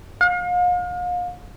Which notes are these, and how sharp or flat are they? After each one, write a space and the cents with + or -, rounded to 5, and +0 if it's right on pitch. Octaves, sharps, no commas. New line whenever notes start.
F5 +40